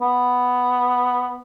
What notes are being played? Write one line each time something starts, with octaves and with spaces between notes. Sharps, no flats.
B3